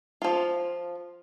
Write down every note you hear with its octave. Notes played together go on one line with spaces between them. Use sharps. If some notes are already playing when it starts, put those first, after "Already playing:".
F3 F4